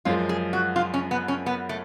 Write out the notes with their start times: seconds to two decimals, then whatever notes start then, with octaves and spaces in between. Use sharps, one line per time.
0.05 F#2 F3 G#3 F4
0.29 G#4
0.53 F#4
0.76 F4
0.94 C#4
1.11 B3
1.28 C#4
1.46 B3
1.69 A3